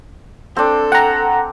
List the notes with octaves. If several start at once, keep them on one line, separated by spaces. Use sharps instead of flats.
C4 D4 A4
F#5 G5 A#5